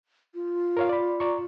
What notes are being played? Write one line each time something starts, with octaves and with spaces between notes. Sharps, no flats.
F4
A#4 C#5 F5
D5 B5
D5 A#5 C#6